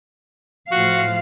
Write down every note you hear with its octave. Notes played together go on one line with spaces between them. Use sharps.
A2 F3 F#4 F5